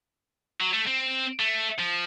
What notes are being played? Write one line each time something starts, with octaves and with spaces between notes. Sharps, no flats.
F#3
A3
C4
A3
F3